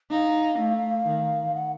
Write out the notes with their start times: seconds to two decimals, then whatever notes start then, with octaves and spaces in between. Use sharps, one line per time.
0.11 D#4 F5
0.59 A3
1.07 D#3
1.55 F#5